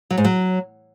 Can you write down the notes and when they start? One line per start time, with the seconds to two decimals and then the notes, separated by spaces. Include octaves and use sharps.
0.11 F#3
0.18 G#2
0.25 F#3